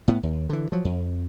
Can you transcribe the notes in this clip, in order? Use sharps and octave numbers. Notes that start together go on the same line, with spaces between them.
A2 B3
D#2
D3 E3
F3 F#3
F2